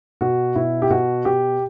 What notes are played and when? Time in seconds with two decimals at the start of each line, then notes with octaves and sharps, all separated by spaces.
0.21 B2 F#4
0.56 B2 E4
0.82 G4
0.90 B2 F#4
1.25 B2 G4